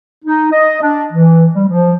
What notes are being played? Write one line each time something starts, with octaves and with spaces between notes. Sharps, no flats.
D#4
D#5
D4
E3
G3
F3